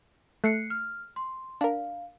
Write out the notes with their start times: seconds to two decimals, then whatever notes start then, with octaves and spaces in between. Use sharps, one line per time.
0.44 A3 F#6 C7 C#7
0.70 F6
1.16 C6
1.61 D4 A#4 F5